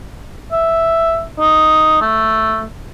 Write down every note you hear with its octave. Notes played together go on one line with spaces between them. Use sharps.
E5
D#4
A3